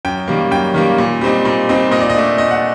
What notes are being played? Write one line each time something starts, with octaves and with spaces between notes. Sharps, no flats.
F#2 G5
D#3 G3 A#3
F#2 G5
D#3 G3 A#3
A#2
G3 C4 D#4
A#2
G3 C4 D#4
A#2 D#5
D5
D#5
A3 D4
A#2 D#5
F#5